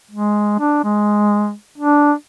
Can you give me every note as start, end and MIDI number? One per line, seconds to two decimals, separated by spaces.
0.11 0.57 56
0.60 0.83 62
0.84 1.53 56
1.78 2.13 62